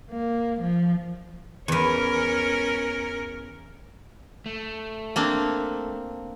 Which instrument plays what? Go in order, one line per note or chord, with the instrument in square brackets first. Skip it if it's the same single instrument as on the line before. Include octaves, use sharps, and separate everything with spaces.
[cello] A#3
F3
[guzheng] E2 E3 [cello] C#4 A#4
[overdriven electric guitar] A3
[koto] A#3 C4 D4